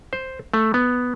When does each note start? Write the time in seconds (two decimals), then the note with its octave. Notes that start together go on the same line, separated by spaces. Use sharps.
0.13 C5
0.54 A3
0.74 B3